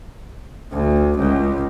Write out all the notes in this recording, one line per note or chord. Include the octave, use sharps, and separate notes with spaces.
D2
C#2